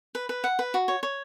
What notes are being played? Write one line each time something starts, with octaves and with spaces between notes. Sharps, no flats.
B4
B4
F#5
B4
F#4
C#5
C#5